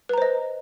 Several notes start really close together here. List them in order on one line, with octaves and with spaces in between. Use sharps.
B4 A#5 C5 D#5